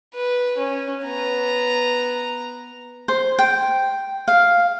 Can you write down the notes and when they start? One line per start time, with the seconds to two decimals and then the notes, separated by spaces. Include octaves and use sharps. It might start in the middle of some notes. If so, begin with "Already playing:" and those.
0.14 B4
0.58 C#4
1.04 B3 A#5
3.08 C5
3.39 G5
4.28 F5